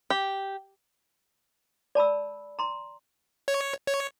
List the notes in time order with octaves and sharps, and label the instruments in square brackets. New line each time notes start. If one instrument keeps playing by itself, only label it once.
[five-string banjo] G4
[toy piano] D5 A5 B5 E6
A#5 C6
[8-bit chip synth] C#5
C#5